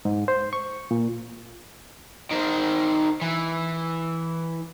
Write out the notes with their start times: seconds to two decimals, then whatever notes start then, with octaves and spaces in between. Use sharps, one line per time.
0.05 G#2
0.28 C5
0.53 C#6
0.91 A#2
2.31 D#3 C5
3.22 E3